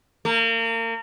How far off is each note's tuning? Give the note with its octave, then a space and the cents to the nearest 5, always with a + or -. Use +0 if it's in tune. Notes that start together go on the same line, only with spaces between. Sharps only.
A#3 -35